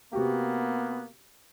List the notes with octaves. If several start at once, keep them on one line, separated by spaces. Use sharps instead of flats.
C3 A#3 B3 F#4 G4